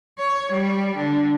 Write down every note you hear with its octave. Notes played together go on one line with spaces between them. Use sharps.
C#5
G3
D3